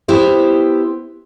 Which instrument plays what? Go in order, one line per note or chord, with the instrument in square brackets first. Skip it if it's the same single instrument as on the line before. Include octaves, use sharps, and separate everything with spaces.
[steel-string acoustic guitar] B3 E4 G4 C5